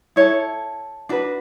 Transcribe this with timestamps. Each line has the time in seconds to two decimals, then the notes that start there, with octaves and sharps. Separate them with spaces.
0.16 E4 A4 C#5
1.09 D4 F#4 B4